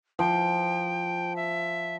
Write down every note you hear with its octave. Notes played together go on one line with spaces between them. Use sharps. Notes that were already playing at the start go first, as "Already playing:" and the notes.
F3 G5
E5